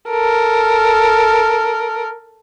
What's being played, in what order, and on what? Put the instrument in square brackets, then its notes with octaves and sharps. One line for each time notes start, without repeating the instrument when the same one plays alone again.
[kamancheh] A4 A#4